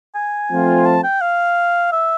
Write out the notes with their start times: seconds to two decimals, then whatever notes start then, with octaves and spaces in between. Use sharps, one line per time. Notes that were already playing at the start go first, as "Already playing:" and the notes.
0.15 G#5
0.51 F3 A3 C4 F4
0.86 A5
1.04 G5
1.21 F5
1.92 E5